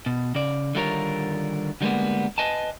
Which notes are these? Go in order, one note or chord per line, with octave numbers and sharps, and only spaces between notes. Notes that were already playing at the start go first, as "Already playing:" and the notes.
B2
C#3 D5
D3 D#3 G3 F4 A#4 C#5
D3 G3 G#3 A#3 B3
B4 D#5 G#5 A5